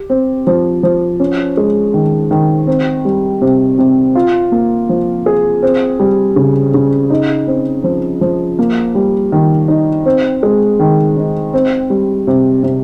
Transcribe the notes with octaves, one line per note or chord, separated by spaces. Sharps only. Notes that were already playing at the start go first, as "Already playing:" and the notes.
Already playing: G4
C4
F3
F3
C#4
G#3
D#3
D#3
C4
G3
C3
C3
F4
A#3
F3
G#4
C4
G3
C#3
C#3
D#4
C4
F3
F3
A#3
G3
D#3
D#4
C4
G#3
D#3
D#4
C4
G3
C3
C3